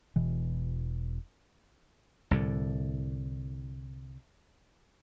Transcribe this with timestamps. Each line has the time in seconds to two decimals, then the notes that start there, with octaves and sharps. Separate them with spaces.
0.16 E1 B2 E3
2.31 C2 A2 D3